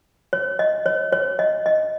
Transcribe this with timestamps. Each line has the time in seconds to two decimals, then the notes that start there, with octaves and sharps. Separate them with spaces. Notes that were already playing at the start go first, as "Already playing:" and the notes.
0.33 C#5
0.59 D#5
0.86 C#5
1.13 C#5
1.39 D#5
1.66 D#5